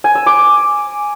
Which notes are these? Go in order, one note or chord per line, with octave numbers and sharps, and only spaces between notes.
G#5
E6
D6